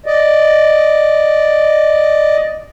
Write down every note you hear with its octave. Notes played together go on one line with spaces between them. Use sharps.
D5 D#5